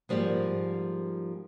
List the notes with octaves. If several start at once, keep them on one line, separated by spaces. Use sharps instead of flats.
G#2 F3 G3 A#3 G#4